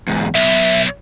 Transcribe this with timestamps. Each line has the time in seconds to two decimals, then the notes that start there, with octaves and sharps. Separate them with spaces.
0.07 E2 G#2
0.35 B1 E5